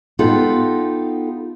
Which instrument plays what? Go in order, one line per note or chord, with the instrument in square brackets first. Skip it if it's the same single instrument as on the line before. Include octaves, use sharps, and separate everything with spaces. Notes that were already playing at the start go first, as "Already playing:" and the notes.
[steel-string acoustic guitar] B3 D#4 F4 G4 A4